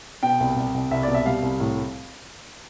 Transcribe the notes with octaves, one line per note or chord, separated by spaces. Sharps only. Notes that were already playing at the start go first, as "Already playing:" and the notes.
B2 G5
C2
C2
C2
C2 E5
B2 D5
E5
G3 F5
C2
A2